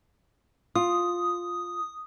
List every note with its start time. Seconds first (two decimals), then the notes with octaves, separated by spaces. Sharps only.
0.76 F4 D#6